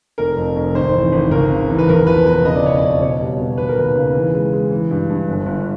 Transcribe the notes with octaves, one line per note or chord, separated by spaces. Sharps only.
F1 A#4
F2
F1
G#1 C5
E3
G#1
C#2 A#4
C#3
E3
B4
E2 A#4
F3 B4
E1 B4
C#3 D#5
D5
C#3 C#5
D5
F2
B2 C#5
G3
B2
D#2 B4
A#4
D#2 B4
C#3
E3
G#3
G#3
E3
G2
G2
G1
G1